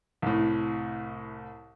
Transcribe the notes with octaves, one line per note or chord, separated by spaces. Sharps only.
C2 A2